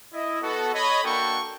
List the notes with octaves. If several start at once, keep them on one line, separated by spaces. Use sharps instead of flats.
E4 D#5
B3 F#4 A4
C#5 D#5 B5
A#3 D4 F#4 A4 G5 C#6